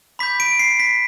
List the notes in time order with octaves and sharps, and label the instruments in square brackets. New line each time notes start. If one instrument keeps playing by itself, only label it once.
[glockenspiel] B5 D6 G6 B6
D7
C7
B6